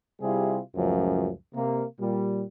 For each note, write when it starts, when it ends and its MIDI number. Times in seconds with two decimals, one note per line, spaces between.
0.22 0.60 48
0.22 0.60 55
0.22 0.60 64
0.22 0.60 65
0.22 0.60 68
0.76 1.32 37
0.76 1.32 42
0.76 1.32 45
0.76 1.32 53
1.55 1.85 48
1.55 1.85 58
2.01 2.44 46
2.01 2.44 55